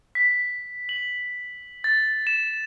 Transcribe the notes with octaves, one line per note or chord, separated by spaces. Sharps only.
B6
F#7
A6
E7